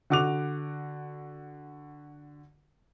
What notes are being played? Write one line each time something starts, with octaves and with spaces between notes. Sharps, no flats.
D3 F#4 D6 F#6 F7